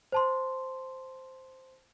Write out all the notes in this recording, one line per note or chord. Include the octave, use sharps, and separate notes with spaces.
C5 A5 C6